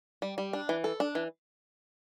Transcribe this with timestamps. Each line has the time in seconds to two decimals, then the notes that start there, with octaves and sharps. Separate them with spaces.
0.22 G3
0.38 G3
0.53 D4
0.69 E3
0.84 A4
1.00 D4
1.15 E3